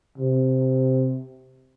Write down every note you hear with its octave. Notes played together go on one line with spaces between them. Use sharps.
C3